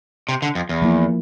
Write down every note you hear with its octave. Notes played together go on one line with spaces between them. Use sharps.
C3
D3
F2
E2
F3 A#3 E4